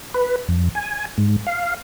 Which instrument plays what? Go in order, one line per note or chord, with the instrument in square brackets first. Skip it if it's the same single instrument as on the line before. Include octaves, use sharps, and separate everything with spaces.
[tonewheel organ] B4
F2
G#5
G#2
F5